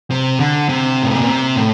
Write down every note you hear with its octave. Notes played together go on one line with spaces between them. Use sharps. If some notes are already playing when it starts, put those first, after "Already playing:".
C3
D3
C3
A2
A#2
C3
A2